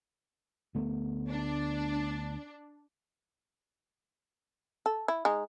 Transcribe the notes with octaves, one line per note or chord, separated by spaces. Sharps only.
D2 A3 B3
D4
A4
E4
G#3 D#4